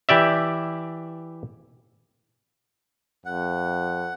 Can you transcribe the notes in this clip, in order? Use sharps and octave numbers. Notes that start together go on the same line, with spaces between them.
E3 G4 D5 E5
F2 F#5